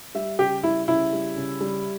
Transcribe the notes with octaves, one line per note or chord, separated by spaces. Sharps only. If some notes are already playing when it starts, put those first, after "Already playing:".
G3 E5
C#3 G4
G3 E4
C#3 E4
G3
C#3
G3